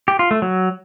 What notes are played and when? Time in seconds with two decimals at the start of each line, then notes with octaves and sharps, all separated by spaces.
0.08 G4
0.19 F4
0.31 A3
0.42 F#3